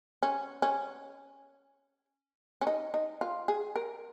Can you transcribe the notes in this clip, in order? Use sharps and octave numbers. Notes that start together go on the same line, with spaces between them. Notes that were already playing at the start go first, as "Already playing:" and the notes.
C#4
C#4
C#4
D#4
D#4
F4
G#4
A#4